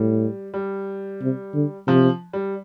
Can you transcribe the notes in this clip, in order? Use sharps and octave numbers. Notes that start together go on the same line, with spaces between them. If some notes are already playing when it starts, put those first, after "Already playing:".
Already playing: A2 G3
G3
C3
D3
C3 F3
G3